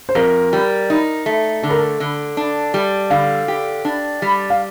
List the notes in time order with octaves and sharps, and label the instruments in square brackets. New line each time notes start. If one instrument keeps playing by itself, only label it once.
[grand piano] C5
[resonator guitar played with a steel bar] F2 [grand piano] A#4
[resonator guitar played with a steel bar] G3
D#4
A3
[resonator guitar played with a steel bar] D3 [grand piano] A4
[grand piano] A#4
A4
[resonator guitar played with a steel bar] D3
D4
G3
[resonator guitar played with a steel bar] D3 [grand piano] F5
[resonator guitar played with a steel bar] G4
D4
G3
[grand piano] F5